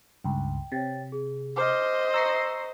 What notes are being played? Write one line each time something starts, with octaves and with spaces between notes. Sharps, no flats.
C#2 G2 G5
C3 C#5 G5 A6
G#4
C5 D#5 D6 F6
A#5 C#6 E6 A#6 C7 C#7